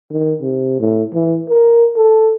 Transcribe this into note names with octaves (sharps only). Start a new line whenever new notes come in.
D#3
C3
A2
E3
A#4
A4